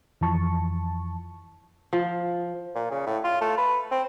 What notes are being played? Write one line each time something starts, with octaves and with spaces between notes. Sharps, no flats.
F2 E3 F3 A5 C#6
F3
A#2
C#3
A2
F4
A3
B4
C4